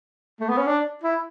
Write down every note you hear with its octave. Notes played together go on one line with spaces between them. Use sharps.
A3
B3
C#4
D4
E4